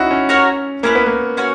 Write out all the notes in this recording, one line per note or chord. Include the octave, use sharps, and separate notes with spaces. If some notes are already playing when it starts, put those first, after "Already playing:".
Already playing: C#4 D#4 E4 F#4
C#4
F#4 A#4 C#5
A#3 C#4 E4 B4
B3
A#3
C#4 F#4 C#5